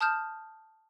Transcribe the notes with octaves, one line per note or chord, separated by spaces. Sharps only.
A5 D#6 F6 G6 E7